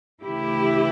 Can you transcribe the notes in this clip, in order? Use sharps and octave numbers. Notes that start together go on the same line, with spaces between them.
D2 C#3 E3 A3 E4 G4